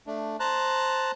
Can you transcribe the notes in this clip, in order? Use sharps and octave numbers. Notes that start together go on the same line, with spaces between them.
A3 D4
C5 A5 A#5 F#6